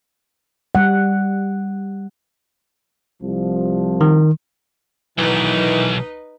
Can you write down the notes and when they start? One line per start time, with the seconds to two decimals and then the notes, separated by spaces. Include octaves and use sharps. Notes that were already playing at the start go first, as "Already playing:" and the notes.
0.75 G3 F#5
3.22 C2 F3
4.01 D#3
5.18 B1 D#3 E3 D#4 B4 D#5